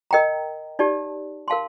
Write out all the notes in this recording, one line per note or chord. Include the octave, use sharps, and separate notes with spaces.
A#4 D#5 G5 A#5
D#4 G4 D5 A5
A#4 F5 A5 C6